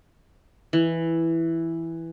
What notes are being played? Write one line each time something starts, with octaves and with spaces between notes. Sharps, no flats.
E3